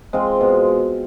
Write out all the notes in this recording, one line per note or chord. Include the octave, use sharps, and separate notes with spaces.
G#3 C4 F4
B2